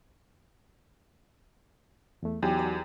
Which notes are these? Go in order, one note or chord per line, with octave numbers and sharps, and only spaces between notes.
E2 A3
E2 F#3 D#4 F#4 G4
D5